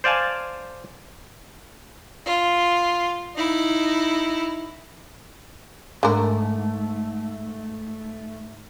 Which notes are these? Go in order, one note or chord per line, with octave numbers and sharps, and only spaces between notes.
C5 D5 F5 G#5 A5
F4
D#4 E4
G#2 D3 A3 A#4